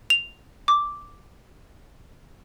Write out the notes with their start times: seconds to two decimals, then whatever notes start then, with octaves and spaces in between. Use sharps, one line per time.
0.10 F7
0.68 D6